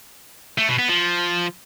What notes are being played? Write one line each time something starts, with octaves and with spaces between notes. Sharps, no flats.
A3
B2
B3
F3